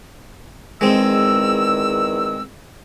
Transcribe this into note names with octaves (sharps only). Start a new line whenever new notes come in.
E2 D#3 G#3 C4 E6